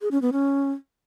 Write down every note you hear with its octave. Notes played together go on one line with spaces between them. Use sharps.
G#4
C#4
B3
C#4